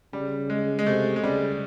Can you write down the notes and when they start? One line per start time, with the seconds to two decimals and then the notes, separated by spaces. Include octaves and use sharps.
0.13 C#3 G3
0.50 G#3
0.79 G#3
0.86 C3 A3
1.16 G#3
1.24 C#3 G3